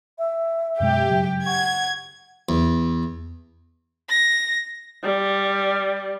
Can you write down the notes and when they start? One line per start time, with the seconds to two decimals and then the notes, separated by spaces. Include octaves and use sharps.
0.18 E5
0.80 F#2 B2 G#3 G4
1.09 G2 C#3 F#3
1.46 F#5 C#6 G#6
2.49 E2
4.09 A#6
5.03 G3